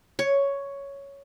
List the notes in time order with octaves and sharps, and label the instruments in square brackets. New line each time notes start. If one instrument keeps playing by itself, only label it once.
[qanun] C#5